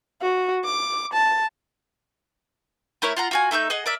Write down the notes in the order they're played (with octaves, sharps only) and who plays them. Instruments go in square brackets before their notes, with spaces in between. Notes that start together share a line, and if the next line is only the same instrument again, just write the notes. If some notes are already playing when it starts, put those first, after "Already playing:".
[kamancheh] F#4
D6
A5
[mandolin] A3 E4 A#4 C#5
F4 F#5 A#5
F4 F#4 G#5
A3 D#4 E5 G6
G#4 D#5 F#5
A#4 D5 E5